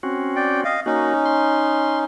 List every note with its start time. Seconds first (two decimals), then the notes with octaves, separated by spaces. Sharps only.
0.03 C4 C#4 F#4
0.36 D5 G5
0.65 D#5 F5
0.86 A#3 C#4 D#4 F#4
1.26 C6